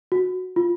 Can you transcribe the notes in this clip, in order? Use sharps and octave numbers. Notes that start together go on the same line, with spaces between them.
F#4
F4